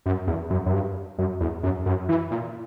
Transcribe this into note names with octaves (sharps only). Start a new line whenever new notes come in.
F#2
E2
F#2
F#2
G2
F#2
E2
F#2
F#2
E3
A#2